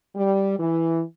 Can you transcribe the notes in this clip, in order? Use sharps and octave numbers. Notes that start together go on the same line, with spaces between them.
G3
E3